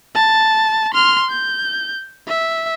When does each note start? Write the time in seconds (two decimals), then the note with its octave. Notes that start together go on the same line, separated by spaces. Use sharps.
0.15 A5
0.94 C6 F6
1.31 G6
2.28 E5